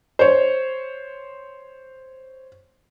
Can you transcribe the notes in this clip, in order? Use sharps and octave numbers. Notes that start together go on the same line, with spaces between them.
C5 C#5